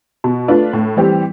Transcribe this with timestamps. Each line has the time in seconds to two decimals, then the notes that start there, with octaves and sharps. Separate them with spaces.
0.24 B2
0.48 A3 D4 F4 B4
0.73 A2
0.97 E3 G3 C4 G4